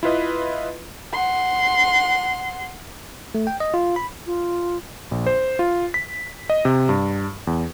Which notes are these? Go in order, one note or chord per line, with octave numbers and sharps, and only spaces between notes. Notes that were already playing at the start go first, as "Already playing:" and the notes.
E4 F4 B4 D#5
F#5 C6
A3
G5
D#5
F4
B5
F4
A#1
C5
F4
B6
D#5
C3
G2
E2